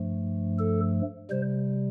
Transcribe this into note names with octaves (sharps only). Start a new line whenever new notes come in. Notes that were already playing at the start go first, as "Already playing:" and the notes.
Already playing: G2 F3 A3
A4
C3 G3 C5